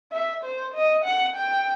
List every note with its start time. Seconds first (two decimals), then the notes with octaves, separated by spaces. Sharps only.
0.12 E5
0.44 C5
0.75 D#5
1.05 F#5
1.36 G5